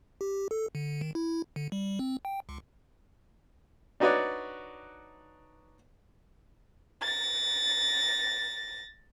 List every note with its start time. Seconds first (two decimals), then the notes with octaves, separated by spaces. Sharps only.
0.21 G4
0.51 A4
0.75 D3
1.01 D#3
1.15 E4
1.56 D3
1.72 G3
1.99 C4
2.25 G5
2.49 C#2
4.00 D4 D#4 F#4 B4 C#5 D5
7.02 A6 A#6